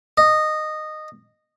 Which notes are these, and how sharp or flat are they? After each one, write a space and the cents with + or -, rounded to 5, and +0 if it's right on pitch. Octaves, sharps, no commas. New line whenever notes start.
D#5 -15